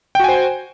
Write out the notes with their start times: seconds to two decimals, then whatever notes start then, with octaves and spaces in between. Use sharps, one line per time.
0.15 G5
0.20 F#4
0.24 G#5
0.29 C5